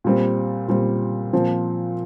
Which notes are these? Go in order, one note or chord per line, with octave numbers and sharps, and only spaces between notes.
A#2 G3 C4
A#2 G3 C4
A#2 F3 C4